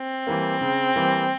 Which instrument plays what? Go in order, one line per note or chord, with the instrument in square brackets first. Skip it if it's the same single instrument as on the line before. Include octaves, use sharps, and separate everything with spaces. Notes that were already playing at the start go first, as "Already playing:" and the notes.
Already playing: [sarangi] C4
[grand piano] E3 G3 A#3
C#3
E3 G3 A#3